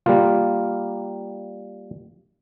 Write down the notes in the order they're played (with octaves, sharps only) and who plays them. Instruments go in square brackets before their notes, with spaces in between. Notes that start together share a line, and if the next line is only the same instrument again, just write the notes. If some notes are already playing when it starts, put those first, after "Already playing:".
[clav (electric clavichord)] G3 A#3 F4